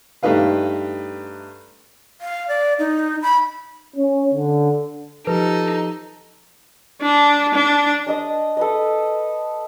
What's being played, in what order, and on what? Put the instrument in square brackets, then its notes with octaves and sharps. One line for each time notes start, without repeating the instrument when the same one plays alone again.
[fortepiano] G2 A3 D#4 B4 F5
[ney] F5
D5
D#4
B5
[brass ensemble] C#4
D3
[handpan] F3 G4 [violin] D#4 [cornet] A4 [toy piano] B4
[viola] D4
D4
[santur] D4 D#5 D#6
A4 B4 D#5